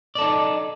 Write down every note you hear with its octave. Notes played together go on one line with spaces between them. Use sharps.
D#4 A4 D5